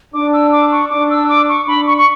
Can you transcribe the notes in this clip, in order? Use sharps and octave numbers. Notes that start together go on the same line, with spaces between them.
D4 D6
E6
D6
C#6
D4 D6
E6
D6
C#6
D4 B5
C#6
C#6